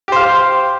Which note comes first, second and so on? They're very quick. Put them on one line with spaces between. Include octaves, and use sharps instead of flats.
G4 C5 F5